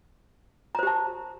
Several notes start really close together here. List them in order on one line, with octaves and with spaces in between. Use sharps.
A#5 C5 G4 A5